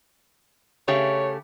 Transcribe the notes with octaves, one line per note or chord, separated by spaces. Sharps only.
C#3 A3 G4 C#5